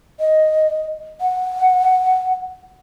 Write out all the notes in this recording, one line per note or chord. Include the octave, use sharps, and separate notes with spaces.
D#5
F#5